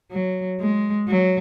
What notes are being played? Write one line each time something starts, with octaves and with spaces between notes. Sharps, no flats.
F#3
G#3
F#3